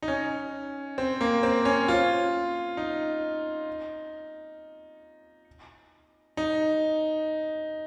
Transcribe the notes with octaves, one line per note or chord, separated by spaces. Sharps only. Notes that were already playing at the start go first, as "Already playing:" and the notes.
D#4
C#4
C4
A#3
C4
C#4
F4
D#4
D#4